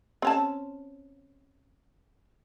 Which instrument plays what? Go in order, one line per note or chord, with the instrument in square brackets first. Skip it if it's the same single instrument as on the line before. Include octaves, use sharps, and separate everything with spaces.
[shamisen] C4 C#4 A5